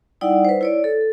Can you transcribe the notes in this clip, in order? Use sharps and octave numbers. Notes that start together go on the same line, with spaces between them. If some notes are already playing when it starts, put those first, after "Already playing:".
G3 D#4 E4 D5 F#5
B4 C5
E4 C#5 D5
A4